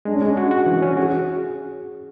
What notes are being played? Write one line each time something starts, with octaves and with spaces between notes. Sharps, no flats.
G#3 D4
C#4
G#3 D4
F#4
F#4
E3
C#4
F#4 G#4